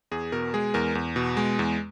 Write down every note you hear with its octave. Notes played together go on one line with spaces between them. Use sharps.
E2 G#4
B2 A#4
G#3 G#4
E2 A#4
E2
B2
G#3
E2